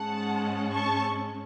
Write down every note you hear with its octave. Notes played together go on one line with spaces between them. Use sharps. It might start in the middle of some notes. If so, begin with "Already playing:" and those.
Already playing: G#2 G#3 C#4 F#5 A5
A5 C#6